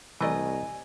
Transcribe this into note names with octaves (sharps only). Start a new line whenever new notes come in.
C2 E3 A3 D5 D#5 G#5 A#5